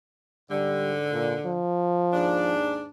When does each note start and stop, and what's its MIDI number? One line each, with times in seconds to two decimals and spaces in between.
0.51 1.60 44
0.51 1.60 50
0.51 0.94 55
1.13 1.34 46
1.46 2.54 53
2.13 2.88 39
2.13 2.88 44
2.13 2.88 62